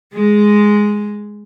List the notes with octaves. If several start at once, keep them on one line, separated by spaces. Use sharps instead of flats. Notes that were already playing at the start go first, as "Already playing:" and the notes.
G#3